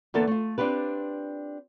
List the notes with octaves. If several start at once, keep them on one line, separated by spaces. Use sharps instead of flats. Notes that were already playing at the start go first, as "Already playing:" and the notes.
E2 D3 A#3 B3 A4 A5
A3 F4
C4 D4 F4 G4 B4